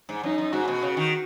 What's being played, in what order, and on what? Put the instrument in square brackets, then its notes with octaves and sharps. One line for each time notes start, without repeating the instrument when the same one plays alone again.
[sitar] G#2
[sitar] F#2 [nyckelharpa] D#4
[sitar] F#2
[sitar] G#2 [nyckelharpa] F#4
[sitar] B2
C#3
D#3